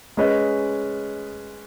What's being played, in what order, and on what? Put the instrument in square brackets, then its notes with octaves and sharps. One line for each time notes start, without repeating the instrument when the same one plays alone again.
[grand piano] G#3 C#4 G#4 B4 D#5